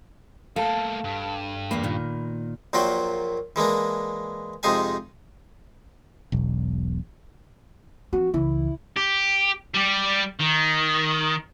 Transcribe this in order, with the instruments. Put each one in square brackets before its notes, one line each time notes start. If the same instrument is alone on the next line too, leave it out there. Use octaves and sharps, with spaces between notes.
[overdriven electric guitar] A3 A#3 [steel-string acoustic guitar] A4 [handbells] F5 A5
[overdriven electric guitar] G2
[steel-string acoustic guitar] E2 A#2 A#3 [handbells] B5
[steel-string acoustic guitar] A#2 D#3
[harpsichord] A#1 A#2 F#3 F4 F#4 G5
E3 G#3 A#3 D4
F2 C3 G#3 D#4 F5 G#5
[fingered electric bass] E1 B1
[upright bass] F3 C4 [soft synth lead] F#4
[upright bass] C#2 E3 [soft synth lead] E4
[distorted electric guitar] G4
G3 G4
D#3